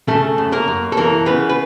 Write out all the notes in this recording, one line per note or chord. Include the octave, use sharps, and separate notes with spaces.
C#3 A3 A4
F#2
A#3 A#4
F#2
A4
E3 A#3 A#4
C#3 B3 B4
B4